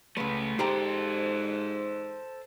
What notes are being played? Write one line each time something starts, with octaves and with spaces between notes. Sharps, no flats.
C#2 A3 B4 C6
G#2 G4 A4 C5 A#5 C6